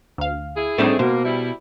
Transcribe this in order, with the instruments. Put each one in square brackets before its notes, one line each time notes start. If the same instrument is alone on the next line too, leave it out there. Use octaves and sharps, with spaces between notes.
[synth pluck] D2 F5
[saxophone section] E4 G#4
[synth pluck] A2 G3 D#4 [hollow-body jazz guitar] A3 C4 D4
[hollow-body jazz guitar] B2 [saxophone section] A#3 [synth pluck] C5
[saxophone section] G3 E4